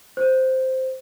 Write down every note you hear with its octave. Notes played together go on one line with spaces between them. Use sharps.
C5